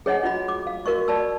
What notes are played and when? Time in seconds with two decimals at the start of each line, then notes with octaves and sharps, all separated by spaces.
0.06 G#4 C#5 D#5 F#5 G#5
0.23 F4 F#4 D#5 B5
0.48 D6
0.67 F5
0.86 F#4 A#4 D#5 C#6
1.08 D5 A5 B5 E6